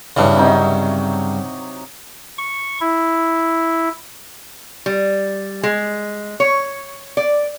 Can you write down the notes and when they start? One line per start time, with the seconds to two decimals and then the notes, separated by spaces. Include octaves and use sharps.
0.17 G2 C#3 E3 D4
0.37 C3 F#3 D#4
2.38 C#6
2.81 E4
4.86 G3
5.63 G#3
6.40 C#5
7.17 D5